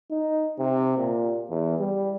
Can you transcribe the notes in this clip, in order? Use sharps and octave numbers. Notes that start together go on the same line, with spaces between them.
D#4
C3
A#2
E2
G3